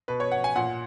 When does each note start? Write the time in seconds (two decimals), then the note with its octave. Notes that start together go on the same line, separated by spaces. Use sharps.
0.08 B2 B4
0.20 C#5
0.32 F#5
0.44 G#5
0.56 A#2 F#5